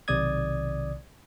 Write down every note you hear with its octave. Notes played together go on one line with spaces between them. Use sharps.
B1 C3 D#3 D5 D#6 G#6